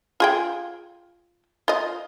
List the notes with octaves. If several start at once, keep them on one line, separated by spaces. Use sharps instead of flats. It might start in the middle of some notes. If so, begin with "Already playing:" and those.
F4 G#4 G5
F4 D#5